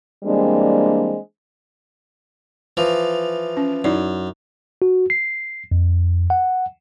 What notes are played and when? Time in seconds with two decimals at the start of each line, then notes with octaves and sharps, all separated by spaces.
0.24 E3 G3 G#3 A#3 C4 D4
2.77 E3 F3
3.57 C#4
3.84 F#2 D#4 E4 D5
4.82 F#4
5.10 C7
5.71 F2
6.30 F#5